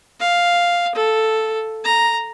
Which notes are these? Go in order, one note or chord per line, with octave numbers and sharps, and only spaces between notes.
F5
A4
A#5